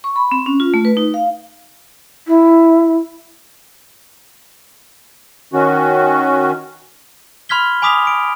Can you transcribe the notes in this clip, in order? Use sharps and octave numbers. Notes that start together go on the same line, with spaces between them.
C#6
B5
C4
C#4
F4
A3
B4
D#4
F5
E4
D#3 C#4 F#4
B5 C6 F6 G#6 B6 G7
G#5 B5 D6 D#6 B6 F7
D7